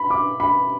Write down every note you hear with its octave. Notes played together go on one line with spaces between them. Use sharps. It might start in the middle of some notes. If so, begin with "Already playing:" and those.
Already playing: B5
D6
B5